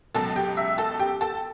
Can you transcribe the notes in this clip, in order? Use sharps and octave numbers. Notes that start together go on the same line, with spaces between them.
C#2 B2 F#3 A4 A5
G4 G5
E5 E6
A4 A5
G4 G5
A4 A5